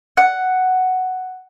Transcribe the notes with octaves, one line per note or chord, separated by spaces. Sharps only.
F#5